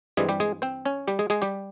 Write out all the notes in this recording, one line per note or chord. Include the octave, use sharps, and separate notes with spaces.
G2 E3 G3 G#3 C4 G#4
G3 G4
G#3 G#4
C4 C5
C#4 C#5
G3 G4
G#3 G#4
G#3 G#4
G3 G4